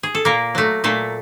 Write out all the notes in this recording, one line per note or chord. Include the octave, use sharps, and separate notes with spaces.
G#4
A4
A#2 A#3 A#4
F#3 A3
A#2 A3 A4